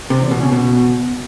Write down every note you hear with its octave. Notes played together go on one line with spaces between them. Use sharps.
C3
E2
B2
C#3
B2